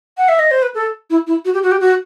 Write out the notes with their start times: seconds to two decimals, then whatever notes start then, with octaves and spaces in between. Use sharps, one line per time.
0.17 F#5
0.28 E5
0.39 D#5
0.51 C5
0.62 B4
0.74 A4
1.10 E4
1.27 E4
1.45 F#4
1.53 G4
1.63 F#4
1.71 G4
1.80 F#4